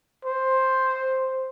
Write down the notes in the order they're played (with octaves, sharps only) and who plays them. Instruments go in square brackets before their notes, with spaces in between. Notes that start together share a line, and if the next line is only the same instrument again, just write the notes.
[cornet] C5